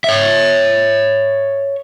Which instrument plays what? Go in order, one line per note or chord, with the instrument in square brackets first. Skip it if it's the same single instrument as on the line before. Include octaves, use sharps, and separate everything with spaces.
[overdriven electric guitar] C#5 E5